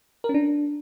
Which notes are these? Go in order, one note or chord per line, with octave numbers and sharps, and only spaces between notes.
A#4
C#4
D4